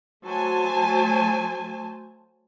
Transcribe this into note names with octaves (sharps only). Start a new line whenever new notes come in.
F#3 A3 C5 G#5 A5